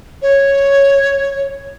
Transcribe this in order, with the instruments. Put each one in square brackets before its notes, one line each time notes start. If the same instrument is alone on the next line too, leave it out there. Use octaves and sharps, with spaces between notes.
[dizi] C#5